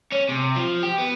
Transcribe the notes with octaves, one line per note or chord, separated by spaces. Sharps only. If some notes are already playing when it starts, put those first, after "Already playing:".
C#4
C3
F3
G4
B3